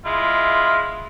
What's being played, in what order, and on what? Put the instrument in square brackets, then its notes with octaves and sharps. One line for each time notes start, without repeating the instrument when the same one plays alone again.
[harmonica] G#3 E4 F4